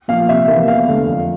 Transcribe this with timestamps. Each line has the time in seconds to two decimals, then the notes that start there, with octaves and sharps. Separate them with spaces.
0.08 A#2 F5
0.12 F3
0.29 C3 E5
0.48 E3 A#3
0.67 E2 F5
0.87 D3 A3
1.07 F2